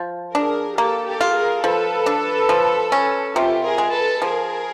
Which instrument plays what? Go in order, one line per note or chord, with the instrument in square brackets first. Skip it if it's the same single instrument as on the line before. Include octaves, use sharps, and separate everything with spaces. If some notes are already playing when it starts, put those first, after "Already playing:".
Already playing: [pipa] F3
[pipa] D4 [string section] G#4 A#4
[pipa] A#3 [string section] G4 A4
[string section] G4 A4
[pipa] F4
[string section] G#4 A#4
[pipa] F3 [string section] A4 B4
[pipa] D4
F3
C#4
[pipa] C3 [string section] F4 G4
[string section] G#4 A#4
[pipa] G#3
[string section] A4 B4
[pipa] F3 [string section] G#4 A#4